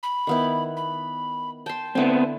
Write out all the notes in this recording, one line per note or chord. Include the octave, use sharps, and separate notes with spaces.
B5
D#3 B3 E4
B5
G5 A5 C6
D3 B3 C4 E4